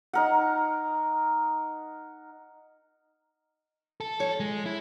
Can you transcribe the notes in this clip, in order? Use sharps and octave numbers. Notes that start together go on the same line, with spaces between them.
D#4 A#4 F#5
A4
F3 C#5
G#3
E4